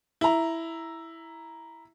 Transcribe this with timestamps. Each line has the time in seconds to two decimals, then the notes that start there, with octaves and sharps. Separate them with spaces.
0.21 E4 A#5